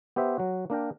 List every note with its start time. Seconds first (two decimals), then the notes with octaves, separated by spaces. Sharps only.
0.16 B3 G4 C5 E5
0.38 F#3 F#4
0.70 A#3 D4 A#4 G5